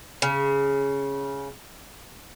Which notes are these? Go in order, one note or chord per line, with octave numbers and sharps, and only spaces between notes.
C#3